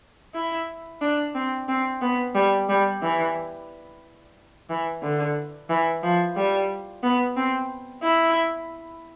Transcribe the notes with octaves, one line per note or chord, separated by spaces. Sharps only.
E4
D4
C4
C4
B3
G3
G3
E3
E3
D3
E3
F3
G3
B3
C4
E4